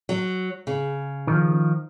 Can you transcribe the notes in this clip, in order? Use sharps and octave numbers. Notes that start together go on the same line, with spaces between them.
F#3
C#3
D#3 F3